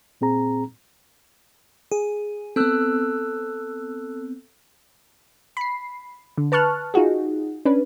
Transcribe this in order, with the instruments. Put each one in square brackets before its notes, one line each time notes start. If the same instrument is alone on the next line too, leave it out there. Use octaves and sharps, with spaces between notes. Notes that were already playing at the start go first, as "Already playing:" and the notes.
[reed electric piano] A#2 C4 G#4 A#5
[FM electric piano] G#4
[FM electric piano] B3 C4 [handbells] A4 E6 F#6
[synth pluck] B5 C7
D3
B4 A5 C#6 F6 F#6
D#4 F4 F#4 G#4
C#4 D4 B4